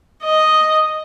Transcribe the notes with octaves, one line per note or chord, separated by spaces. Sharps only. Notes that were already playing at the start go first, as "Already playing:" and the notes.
D#5